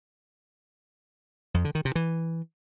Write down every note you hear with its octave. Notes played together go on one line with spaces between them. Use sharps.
F2
D3
D#3
C3
E3